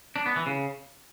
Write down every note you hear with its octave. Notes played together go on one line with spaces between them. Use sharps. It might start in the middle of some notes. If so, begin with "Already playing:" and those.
D4
B3
E3
C#3